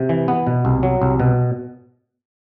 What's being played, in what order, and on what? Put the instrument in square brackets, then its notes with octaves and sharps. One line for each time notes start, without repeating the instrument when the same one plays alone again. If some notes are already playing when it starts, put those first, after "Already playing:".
Already playing: [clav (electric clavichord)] C3
E3
B3
B2
C2
F#3
C2
B2